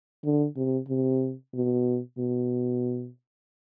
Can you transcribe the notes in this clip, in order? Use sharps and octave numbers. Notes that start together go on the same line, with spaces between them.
D3
C3
C3
B2
B2